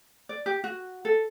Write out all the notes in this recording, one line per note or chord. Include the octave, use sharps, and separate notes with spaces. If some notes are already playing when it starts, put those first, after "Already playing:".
D5
G4
F#4
A4